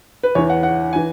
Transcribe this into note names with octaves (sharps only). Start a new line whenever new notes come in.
B4
E2 E3 C#5
F#5
F#5
E3 G#5